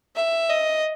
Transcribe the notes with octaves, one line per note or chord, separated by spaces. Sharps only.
E5
D#5